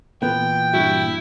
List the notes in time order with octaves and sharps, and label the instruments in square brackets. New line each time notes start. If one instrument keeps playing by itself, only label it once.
[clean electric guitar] A#2 E3 [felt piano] B3 [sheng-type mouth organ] G5
[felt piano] G2 F#4 [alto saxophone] E4